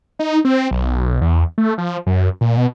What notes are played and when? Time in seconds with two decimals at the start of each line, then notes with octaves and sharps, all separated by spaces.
0.19 D#4
0.45 C4
0.71 B1
1.21 E2
1.58 A3
1.78 F3
2.06 F#2
2.41 A#2
2.57 B2